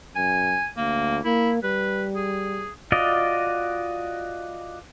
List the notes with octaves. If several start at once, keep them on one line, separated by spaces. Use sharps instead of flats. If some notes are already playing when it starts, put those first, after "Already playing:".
F#2 G#5
D2 A#3
A#3 E4
G3 B4
G#4
F4 F#4 D5 D#5